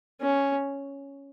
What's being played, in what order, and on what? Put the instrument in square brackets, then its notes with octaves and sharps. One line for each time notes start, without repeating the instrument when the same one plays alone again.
[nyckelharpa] C#4